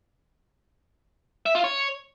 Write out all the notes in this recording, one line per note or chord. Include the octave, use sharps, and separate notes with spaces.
E5
F4
C#5